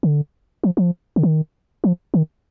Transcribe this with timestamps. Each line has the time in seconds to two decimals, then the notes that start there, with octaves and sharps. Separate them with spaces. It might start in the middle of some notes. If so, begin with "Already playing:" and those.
0.03 D3
0.64 F3
0.77 F3
1.16 D3
1.23 D#3
1.84 F3
2.14 D#3